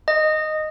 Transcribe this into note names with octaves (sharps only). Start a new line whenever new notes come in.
D#5